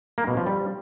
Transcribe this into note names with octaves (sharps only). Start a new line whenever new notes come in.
A#3
B2
F3
G3